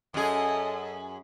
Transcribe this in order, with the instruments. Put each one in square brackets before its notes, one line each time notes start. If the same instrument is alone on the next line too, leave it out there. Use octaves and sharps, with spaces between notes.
[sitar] F#2 G#4 [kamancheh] A4 D#5